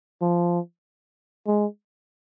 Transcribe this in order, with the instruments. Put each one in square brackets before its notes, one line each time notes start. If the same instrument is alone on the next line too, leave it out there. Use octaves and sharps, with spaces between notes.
[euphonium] F3
G#3